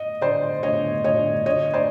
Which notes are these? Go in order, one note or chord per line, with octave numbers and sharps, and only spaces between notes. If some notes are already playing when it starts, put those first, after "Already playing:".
Already playing: D#5
C5 D5
C#5 D#5
C#5 D#5
C#5 D#5
C5 D5